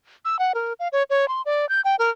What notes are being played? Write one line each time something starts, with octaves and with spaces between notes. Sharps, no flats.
E6
F#5
A#4
F5
C#5
C#5
C6
D5
G6
G5
A#4